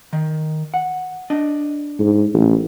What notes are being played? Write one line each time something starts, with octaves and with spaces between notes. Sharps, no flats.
D#3
F#5
D4 D#5
G#2
A1